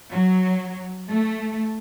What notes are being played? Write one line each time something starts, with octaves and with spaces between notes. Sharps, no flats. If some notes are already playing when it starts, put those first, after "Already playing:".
F#3
A3